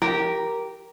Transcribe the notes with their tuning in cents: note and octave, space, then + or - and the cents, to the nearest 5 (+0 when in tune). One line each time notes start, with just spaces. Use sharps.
G4 -10 A#4 +0